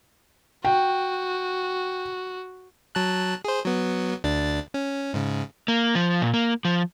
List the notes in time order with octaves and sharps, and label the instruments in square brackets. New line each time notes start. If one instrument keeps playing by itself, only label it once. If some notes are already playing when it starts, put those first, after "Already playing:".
[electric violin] F#4 [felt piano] G5
[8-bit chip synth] F#3 A5 F#6
G#4 C5
F#3 B3
D2 D4 A6
C#4
G#2 C#3
[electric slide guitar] A#3
F3
A#2
A#3
F3